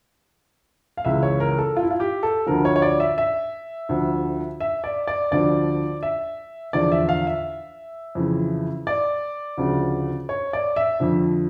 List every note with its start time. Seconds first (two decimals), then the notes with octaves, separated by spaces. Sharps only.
0.97 F5
1.05 C#2 C#3 E3 E5
1.23 C#5
1.40 A#4
1.58 A4
1.77 F4
1.83 E4
1.91 F4
2.00 G4
2.23 A4
2.46 D2 D3 F3 A#4
2.65 C#5
2.76 C#5
2.82 D5
3.00 E5
3.18 E5
3.89 D2 D3 F3
4.60 E5
4.84 D5
5.07 D5
5.31 D2 D3 F3 D5
6.03 E5
6.73 E2 D3 F3 D5
6.92 E5
7.09 F5
7.27 E5
8.15 F2 C#3 E3
8.87 D5
9.58 D2 C#3 F3
10.29 C#5
10.53 D5
10.76 E5
11.00 F2 D3 F3